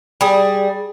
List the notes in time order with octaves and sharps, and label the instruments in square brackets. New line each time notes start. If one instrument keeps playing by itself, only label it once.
[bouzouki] G3 G#4